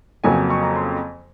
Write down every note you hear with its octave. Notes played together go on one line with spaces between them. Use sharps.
F2 C#3 F#3 A#3 G#5
C#6
A#5
C6